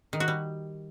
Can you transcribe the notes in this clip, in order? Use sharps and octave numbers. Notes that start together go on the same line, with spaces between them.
D#3
F#4
G3